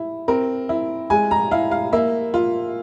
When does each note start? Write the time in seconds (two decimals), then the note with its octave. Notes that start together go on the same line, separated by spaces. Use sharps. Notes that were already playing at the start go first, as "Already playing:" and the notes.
Already playing: E4
0.28 C4 A#4
0.69 E4
1.10 G#3 G#5
1.31 A#5
1.51 E4 F5
1.71 F5
1.93 A#3 E5
2.34 F4